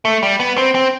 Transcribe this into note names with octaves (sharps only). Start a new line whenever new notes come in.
A3
G3
B3
C4
C4